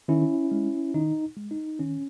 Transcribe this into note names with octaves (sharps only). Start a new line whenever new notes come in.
D#3 C#4 E4
G#3
D#3 D#4
G#3
D#4
D#3 C#4